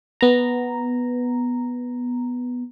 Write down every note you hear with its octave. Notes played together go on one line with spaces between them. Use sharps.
B3 A#5